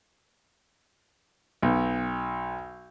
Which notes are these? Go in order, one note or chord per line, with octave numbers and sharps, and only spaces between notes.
B1